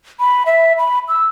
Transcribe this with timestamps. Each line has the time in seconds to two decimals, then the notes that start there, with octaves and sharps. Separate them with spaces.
0.20 B5
0.46 E5
0.78 B5
1.08 E6